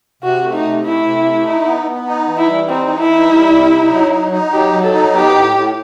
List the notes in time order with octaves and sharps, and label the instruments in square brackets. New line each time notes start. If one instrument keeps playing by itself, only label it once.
[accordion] C3 [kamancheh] F#4
[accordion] A3
[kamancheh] D#4
[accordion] C3
[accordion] A3 [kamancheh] E4
[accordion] C3
A3
D#4
B3
B3
D#4
E3
[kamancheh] E4
[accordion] G3
[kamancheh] C4 [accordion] D#4
[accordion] E3
[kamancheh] E4
[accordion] D#4
G3
C3
D#4
F#3
D#4
D#4
[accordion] F#3 [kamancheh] G4
[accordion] F#3
[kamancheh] A4
[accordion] D#4
[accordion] B3 [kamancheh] G4
[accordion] A2
A2